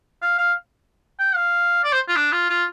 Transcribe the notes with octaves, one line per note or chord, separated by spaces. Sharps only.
F5
F5
G5
F5
D5
C5
F4
D4
F4
F4